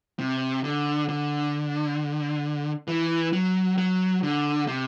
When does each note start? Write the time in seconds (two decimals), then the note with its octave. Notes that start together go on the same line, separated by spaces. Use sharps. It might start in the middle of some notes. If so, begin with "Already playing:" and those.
0.19 C3
0.64 D3
1.09 D3
2.88 E3
3.33 F#3
3.78 F#3
4.23 D3
4.67 C3